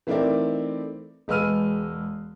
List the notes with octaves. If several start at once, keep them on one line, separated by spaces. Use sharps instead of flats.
E3 A3 C4 D#4 A#4 D5
E1 G#3 B4 E6 F6 D#7